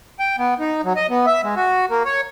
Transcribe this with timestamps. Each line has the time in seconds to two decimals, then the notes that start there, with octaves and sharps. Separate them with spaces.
0.19 G5
0.38 B3
0.60 D#4
0.84 F#3
0.96 D#5
1.10 B3
1.27 E5
1.44 G#3
1.56 F#4
1.90 A#3
2.05 C#5